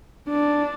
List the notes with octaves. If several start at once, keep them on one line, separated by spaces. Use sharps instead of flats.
D4